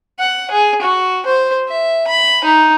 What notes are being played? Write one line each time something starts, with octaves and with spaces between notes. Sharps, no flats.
F#5
G#4
F#4
C5
E5
B5
D#4